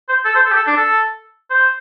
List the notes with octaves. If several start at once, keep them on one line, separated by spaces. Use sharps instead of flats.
C5
A4
C5
A4
G4
A4
D4
A4
C5